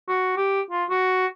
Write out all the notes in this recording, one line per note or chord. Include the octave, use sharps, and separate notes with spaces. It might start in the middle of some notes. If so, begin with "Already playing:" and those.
F#4
G4
F4
F#4